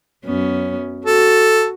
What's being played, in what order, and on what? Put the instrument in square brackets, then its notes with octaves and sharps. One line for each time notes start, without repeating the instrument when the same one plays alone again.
[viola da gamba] F#2 B3 C#4
[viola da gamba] F#4 [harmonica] A4